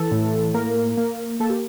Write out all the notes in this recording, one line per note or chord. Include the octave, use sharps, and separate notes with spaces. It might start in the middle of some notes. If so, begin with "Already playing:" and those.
Already playing: E3 A4
A2
A#3 A#4
A#3
A#3 A4
G4